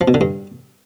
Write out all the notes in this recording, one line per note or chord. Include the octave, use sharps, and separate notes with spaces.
F3
B2
D3
G2